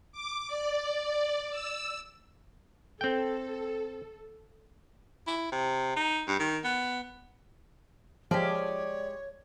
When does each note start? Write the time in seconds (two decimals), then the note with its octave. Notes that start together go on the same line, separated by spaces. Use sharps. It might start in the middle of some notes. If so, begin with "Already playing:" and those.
0.12 D6
0.48 D5
1.51 E6
3.01 C4 A4 G5
5.27 E4
5.52 C3
5.96 D#4
6.28 G2
6.40 D#3
6.64 B3
8.31 F3 G#3 G4 C#5 D5